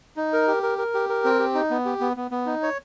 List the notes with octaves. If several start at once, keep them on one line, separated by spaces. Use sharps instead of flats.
D#4
A#4
G4
A#4
A#4
G4
A#4
C4
G4
D#4
B3
G4
B3
B3
B3
D#4
C#5